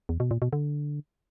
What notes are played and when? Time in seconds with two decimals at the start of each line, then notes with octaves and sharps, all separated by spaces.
0.09 E2
0.20 B2
0.31 A#2
0.42 B2
0.53 D3